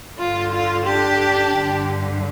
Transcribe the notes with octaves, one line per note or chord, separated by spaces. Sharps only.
G2 D3 F4
F4
D4 G4
G2 D3